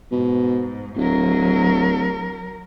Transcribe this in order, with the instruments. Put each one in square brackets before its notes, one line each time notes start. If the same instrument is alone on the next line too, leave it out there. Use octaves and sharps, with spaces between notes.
[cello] G#2 [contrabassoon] B2
[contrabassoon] D1 [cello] F#3 A#4